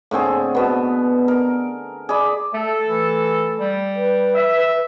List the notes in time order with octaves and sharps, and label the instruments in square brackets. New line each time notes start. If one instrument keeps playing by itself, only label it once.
[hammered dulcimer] A2 D3 C4 G#4
B2 B3
A#4
G#4 D5 B5
[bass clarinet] A3 [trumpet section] A4
[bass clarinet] E3 [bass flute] A3
[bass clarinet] G3
[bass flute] B4
[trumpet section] E5